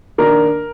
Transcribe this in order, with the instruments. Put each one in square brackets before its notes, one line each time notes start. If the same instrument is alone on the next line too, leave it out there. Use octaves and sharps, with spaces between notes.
[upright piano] D#3 A#3 D4 A#4